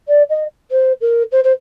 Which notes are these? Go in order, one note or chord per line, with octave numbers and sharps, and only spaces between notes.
D5
D#5
C5
A#4
C5
C5